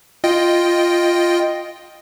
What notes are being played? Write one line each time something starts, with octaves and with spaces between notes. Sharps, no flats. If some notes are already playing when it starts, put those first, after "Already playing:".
F4 D#5 G5